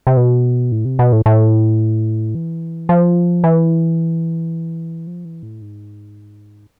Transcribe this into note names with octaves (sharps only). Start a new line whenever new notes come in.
C3
B2
A2
C3
B2
A2
A2
E3
F3
E3
F3
E3
A2
G#2